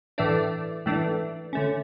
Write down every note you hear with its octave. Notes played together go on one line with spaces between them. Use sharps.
A2 E3 A3 D4 D5
A2 E3 A3 D4
D3 A3 C#4